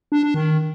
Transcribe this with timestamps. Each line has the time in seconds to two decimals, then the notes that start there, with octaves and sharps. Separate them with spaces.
0.12 D4
0.23 D4
0.34 D#3